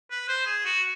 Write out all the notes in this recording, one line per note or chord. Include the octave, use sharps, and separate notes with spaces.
B4
C5
G#4
F#4